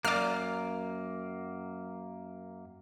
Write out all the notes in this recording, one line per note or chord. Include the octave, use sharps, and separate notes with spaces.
F#2 A#3 D5 F6